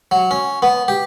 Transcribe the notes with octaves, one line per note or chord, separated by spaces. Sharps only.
F#3
C#4
B3
G4